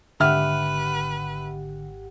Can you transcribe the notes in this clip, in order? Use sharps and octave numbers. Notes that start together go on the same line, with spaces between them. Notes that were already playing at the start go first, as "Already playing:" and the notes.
G#1 D3 G4 B4 E5 F#5 F6